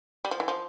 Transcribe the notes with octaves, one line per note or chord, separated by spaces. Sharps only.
G3
F3
E3
F3